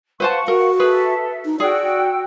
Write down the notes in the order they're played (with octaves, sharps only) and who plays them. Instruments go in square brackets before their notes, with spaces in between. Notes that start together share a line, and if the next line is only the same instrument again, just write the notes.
[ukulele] B4 C5 A5 [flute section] F5 F#5 C#6
[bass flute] F#4 [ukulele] A#4
[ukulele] G#4 B4 [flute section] A4 E5
[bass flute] D#4
[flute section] F#4 G5 E6 [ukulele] G#4 [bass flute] D5